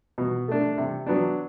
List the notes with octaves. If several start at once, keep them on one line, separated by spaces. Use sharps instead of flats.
B2
A3 D4
C3
F#3 B3 D4